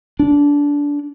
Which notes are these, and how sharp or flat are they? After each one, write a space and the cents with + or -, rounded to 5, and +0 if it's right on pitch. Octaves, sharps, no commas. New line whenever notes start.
D4 -20